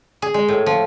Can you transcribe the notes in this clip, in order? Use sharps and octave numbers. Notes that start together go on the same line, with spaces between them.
G#4
G#3
A2
F3